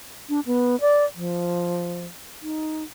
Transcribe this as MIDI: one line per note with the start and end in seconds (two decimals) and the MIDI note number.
0.29 0.40 62
0.46 0.79 59
0.81 1.04 74
1.15 2.06 53
2.42 2.83 63